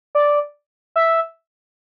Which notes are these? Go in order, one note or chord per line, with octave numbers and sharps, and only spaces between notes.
D5
E5